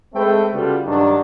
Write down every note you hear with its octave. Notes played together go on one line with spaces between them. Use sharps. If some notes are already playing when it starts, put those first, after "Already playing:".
G#3 A3 C4 A4 B4 G5
C#3 G3 B3 F4 F#4 A4
G2 D#3 F#3 D4